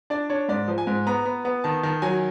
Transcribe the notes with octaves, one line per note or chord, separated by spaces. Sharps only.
D4 D5
D4 C#5
G#2 D5
F3
G#5
G#2
B3 A#5
B3
B3
D#3 A5
D#3 A5
F#3 G#5